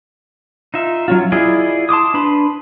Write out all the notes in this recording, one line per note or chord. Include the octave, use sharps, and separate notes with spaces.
D#4 F4 E5
F#3 C#4 F4
E4 F4 G#4 D5 D#5
A5 C6 D6 D#6
D4 B4 B5 C6